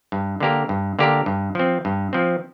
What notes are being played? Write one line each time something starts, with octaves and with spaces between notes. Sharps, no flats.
G2
D3 A#3 G4 A#4
G2
D3 A#3 G4 A#4
G2
F3 C4
G2
F3 C4